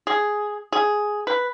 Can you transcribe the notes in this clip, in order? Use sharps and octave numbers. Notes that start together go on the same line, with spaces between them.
G#4
G#4
B4